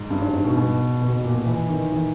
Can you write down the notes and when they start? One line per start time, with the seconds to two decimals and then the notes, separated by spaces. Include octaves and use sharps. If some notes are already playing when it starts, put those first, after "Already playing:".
Already playing: G#2
0.10 G2
0.22 G#2
0.33 G#2
0.44 B2
0.56 B2
1.02 B2
1.12 B2
1.24 A#2
1.35 B2
1.46 E3
1.69 D#3
1.92 D#3